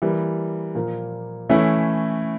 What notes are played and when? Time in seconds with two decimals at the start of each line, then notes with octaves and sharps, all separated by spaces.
0.02 E3 G3 A#3
0.75 A#2 F3 A#3
1.49 E3 A3 C#4 E4